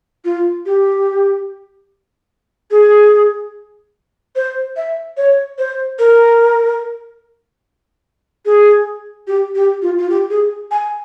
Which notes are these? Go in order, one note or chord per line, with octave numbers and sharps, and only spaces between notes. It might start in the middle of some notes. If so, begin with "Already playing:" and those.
F4
G4
G#4
C5
E5
C#5
C5
A#4
G#4
G4
G4
F4
F4
G4
G#4
G#5